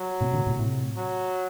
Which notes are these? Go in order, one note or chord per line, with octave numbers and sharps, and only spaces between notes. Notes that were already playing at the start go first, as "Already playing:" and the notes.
Already playing: F#3
A2 C3
A#2 D3
A2 C3
A2 C3
F#3